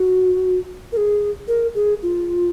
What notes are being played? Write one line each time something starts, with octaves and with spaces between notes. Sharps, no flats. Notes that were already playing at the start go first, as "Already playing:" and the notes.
Already playing: F#4
A#4
G#4
A#4
G#4
F4